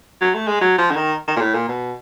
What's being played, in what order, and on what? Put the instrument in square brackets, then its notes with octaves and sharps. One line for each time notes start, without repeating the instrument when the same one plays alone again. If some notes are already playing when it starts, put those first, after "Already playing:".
[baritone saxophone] F#3
A3
G#3
F#3
F3
D3
D#3
D#3
A#2
A2
A#2
B2